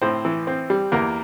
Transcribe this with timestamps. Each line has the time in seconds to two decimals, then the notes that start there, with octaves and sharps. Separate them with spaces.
0.02 A2 C4 C5
0.25 E3
0.47 C4
0.70 G3
0.92 E2 A#3 A#4